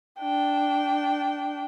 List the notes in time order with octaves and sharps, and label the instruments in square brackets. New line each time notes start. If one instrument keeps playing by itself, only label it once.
[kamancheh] D4 G5